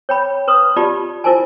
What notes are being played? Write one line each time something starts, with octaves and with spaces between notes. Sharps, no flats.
C#5 G5 B5
B4 C6 D#6
F4 G4 D5 A5 B5
E4 F4 A#4 C5 G#5 A5